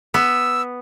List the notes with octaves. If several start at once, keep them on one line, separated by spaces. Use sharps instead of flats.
B3 E6